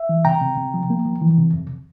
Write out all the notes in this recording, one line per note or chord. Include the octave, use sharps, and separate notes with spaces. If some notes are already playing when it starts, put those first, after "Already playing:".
Already playing: E5
E3
C3 G5 A#5
C3
C3
F3
A#3
F3
E3
C3
F2